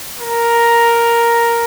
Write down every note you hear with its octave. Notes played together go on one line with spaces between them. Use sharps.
A#4